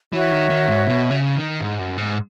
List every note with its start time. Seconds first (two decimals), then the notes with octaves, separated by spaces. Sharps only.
0.13 E3 F#4 C#5 E5
0.31 D#3
0.50 D#3
0.68 G#2
0.87 B2
1.11 C#3
1.36 D#3
1.61 G#2
1.79 F#2
1.98 G#2